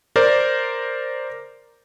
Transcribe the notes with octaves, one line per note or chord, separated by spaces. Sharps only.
A#4 C5 D5